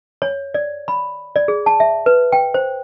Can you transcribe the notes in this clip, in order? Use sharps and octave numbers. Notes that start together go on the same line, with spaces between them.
C#5
D5
B5
D5
G#4
A5
E5
B4
G5
C5